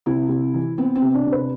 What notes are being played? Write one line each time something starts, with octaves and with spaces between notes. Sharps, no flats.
C3 E4
C3
E3
B3 C4
C4
C3
D4
C3
B4